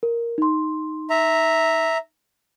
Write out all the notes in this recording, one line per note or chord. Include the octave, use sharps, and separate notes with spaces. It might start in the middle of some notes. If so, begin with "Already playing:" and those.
A#4
D#4 C6
E5 A#5